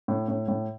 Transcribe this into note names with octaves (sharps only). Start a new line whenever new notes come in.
A2
A2
A2